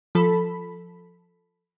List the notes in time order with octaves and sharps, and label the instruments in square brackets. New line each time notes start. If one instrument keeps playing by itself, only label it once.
[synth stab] F3 A4 B5